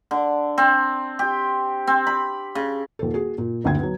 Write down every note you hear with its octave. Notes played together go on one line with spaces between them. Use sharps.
D3
C4
G4
C4
B5
C#3
D#1 A4
F#4 G#4
A#2
F#1 D2 D3 G5 G#6
F#3 B3